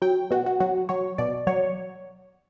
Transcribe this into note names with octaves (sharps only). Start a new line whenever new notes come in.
F#3 G5
B2 F#4
F#4
F#3 F#4
F#3 C#5
B2 D5
F#3 C#5